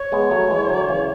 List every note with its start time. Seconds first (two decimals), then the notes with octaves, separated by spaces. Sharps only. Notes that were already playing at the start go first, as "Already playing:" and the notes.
Already playing: C#5
0.12 G#3 B3
0.31 F#3 A3
0.50 E3 G#3
0.69 D3 F#3
0.88 C#3 E3